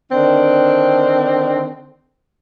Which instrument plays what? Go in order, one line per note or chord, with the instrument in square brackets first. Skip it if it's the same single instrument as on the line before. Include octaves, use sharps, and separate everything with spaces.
[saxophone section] D3 D#3 C4 D4